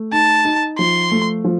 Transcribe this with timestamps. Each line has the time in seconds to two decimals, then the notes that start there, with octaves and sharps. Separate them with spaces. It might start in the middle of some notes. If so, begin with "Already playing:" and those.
Already playing: A3
0.12 D#4 A5
0.45 D#4
0.78 F3 C6
1.12 A3
1.44 F3